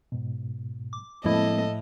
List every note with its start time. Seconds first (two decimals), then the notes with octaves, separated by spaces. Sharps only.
0.12 G#2 B2
0.93 D6
1.24 A2 F3 G#3 A#3 C4 E4 A4 D#5